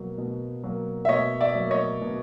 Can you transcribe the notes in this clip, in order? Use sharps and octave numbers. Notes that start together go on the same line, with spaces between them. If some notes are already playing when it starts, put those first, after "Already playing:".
Already playing: B2 F#3 A#3
B2
F#3 A#3
E5
B2 C#5 D#5
D5 E5
F#3 A#3
C#5 D#5
B2